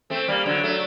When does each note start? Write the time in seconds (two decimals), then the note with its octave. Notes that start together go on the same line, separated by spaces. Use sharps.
0.10 A3 C4
0.28 G3 A#3
0.46 D3 F#3
0.63 F#3 A3